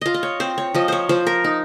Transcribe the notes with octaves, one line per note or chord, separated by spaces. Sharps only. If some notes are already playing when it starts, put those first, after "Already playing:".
F4 D#5 F5
D#5
C#5
C4 C5
C#5
F3 D#5
C5 C#5
F3 C5
A#4
D#4